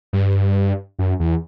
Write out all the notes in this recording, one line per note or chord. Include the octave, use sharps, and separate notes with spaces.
G2
F#2
E2